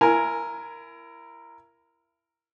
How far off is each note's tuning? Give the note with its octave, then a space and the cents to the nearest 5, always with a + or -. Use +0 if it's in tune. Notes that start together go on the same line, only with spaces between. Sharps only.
E4 +30 A#4 +0 G#5 +5